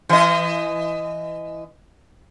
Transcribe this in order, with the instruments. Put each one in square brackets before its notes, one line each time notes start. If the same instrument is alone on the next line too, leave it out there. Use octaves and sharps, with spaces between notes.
[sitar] E3 D#5